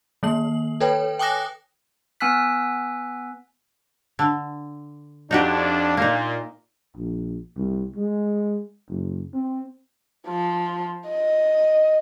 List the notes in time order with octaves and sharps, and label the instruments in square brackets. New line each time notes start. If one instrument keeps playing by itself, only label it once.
[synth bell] D#3 A#3 F#7
A4 B4 C#5 G5
G5 G#5 D6 D#6 F#6 A#6
[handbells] B3 G#5 E6 F#6 B6
[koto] D3
[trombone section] F2 D4 [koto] D#4 F#4 G4
[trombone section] A#2 [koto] A#3 D#4
[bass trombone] A#1
C2
G#3
F#1
C4
[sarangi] F3
D#5